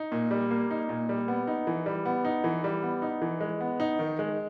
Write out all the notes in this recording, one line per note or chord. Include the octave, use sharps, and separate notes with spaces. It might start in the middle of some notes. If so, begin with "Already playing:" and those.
Already playing: D#4
A#2
G3
A#3
D#4
A#2
G3
B3
D#4
E3
G3
B3
D#4
E3
G3
B3
D#4
E3
G#3
B3
D#4
D#3
G#3